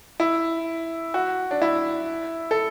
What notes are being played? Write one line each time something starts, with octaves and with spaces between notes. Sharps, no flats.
E4
F#4
D4
E4
A4